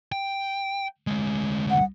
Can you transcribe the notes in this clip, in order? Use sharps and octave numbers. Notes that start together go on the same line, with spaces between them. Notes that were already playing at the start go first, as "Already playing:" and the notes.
G5
D2 G#3
F#5